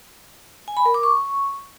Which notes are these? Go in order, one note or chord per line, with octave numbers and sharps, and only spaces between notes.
G#5
B5
A#4
D6
C#6